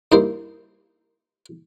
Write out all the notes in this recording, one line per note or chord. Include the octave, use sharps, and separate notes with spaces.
G2 A#3 D#4 E4 C5